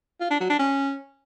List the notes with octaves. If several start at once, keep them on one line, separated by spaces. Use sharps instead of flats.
F4
D4
F#3
D4
C#4